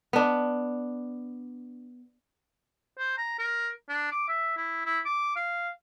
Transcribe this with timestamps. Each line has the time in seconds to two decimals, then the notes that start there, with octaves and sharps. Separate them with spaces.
0.13 B3 D4
2.99 C5
3.18 A#5
3.39 A#4
3.89 D4
4.12 D6
4.28 E5
4.57 E4
4.86 E4
5.05 D6
5.36 F5